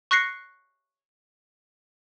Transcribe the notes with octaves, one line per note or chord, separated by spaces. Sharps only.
C#6 F#6 A#6 C7 C#7